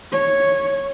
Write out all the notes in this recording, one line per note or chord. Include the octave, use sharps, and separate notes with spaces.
C#5